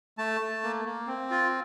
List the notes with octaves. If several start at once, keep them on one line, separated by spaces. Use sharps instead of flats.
A3 A5
A3
A#3
A#3
C4
F4